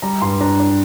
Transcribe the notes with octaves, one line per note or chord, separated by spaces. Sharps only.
G3 A#5
G2 C6
D4 A#5
D4